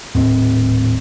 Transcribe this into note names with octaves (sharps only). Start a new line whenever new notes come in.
D#1 A2 C4